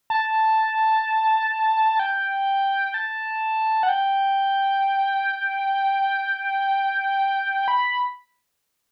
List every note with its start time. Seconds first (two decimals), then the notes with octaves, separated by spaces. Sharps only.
0.10 A5
1.99 G5
2.94 A5
3.83 F#5
3.89 G5
7.68 B5